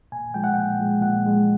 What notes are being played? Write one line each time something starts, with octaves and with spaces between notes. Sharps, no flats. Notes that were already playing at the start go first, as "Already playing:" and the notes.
A#2 G#5
F3 G#3 G5
F#5
A#2 G5
F3 G#3
A#2 F#5
F3 G#3